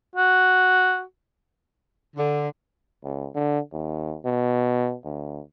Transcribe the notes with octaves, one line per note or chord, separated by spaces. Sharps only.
F#4
D3
C#2
D3
D#2
B2
D2